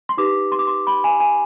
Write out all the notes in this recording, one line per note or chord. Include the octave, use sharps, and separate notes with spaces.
C6
D#4 G4 B4 D6
C6
D6
C6
B5
G#5
G#5